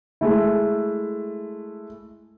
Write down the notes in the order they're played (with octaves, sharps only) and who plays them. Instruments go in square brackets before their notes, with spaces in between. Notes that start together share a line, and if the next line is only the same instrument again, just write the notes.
[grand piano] G#3 A3 E4